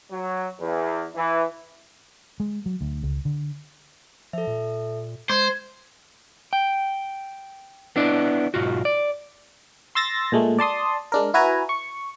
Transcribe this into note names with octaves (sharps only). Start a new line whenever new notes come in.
F#3
E2
E3
G#3
F#3
D2
C#2
D3
F3 A4 E5
A#2
G#3 C5 G#6
G5
B3 D4 E4 D5
B1 G#2 F4 F#4
D5
C6 E6 A6 A#6
A#2 G#3 A3
D5 A5 C6 D#6
G#3 D4 A#4
E4 F#4 B4 G#5 A#5
C#6